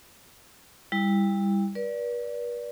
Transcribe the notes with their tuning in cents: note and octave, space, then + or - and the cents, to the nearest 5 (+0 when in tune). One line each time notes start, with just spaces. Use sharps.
G3 +20 E4 +0
B4 -45 D5 -10